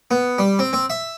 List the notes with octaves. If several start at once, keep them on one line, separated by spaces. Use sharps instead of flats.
B3
G3
C4
C4
E5